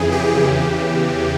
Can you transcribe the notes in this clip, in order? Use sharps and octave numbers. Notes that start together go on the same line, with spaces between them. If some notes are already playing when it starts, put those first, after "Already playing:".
Already playing: F2 C#3 E3 G#4
G4
E2 C#3 E3